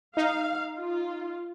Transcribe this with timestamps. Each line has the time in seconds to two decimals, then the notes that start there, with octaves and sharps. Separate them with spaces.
0.17 D#4 F5
0.77 F4